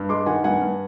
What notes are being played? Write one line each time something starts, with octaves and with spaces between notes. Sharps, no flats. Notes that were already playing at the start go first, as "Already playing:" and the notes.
Already playing: G2
G#3 C6 D6
D#3 F#5 G#5
G2 F#5 G#5
G2